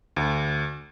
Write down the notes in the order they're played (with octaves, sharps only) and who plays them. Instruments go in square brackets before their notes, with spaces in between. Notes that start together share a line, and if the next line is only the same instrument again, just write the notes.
[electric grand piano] D2